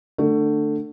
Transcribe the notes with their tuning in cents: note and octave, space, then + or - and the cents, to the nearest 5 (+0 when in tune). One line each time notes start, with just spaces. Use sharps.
D3 +20 A3 +20